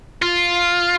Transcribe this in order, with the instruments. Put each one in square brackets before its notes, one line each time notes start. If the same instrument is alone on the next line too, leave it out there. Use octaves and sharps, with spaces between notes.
[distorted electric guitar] F4